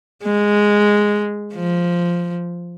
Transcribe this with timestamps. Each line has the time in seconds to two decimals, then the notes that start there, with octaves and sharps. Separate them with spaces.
0.24 G#3
1.54 F3